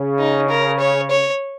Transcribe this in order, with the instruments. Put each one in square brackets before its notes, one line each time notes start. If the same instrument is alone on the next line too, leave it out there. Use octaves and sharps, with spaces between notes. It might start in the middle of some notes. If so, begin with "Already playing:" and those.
Already playing: [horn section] C#3
[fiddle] D#4
A#4
C#5
C#5